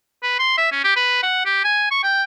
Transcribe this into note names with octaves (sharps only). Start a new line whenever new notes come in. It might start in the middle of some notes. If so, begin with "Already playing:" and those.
B4
C6
E5
C#4
G4
B4
F#5
G4
G#5
C#6
G5